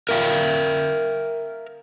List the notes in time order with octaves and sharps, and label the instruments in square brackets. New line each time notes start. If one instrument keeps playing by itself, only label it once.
[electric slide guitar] A#4 E5 F5 G5